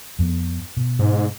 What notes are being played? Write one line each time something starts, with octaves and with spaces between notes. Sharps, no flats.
F2 B3
B2
G#2